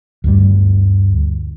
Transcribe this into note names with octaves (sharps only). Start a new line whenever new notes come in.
D2 G2 G3